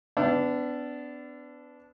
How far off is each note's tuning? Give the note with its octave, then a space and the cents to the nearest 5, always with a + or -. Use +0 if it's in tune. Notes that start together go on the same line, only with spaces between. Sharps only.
B3 +30 D4 -10 E5 +35